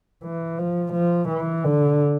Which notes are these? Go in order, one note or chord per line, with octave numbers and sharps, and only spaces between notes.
E3
F3
F3
E3
D3